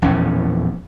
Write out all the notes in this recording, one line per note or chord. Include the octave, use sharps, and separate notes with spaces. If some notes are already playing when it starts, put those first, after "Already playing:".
A#1 E2 A2 C#4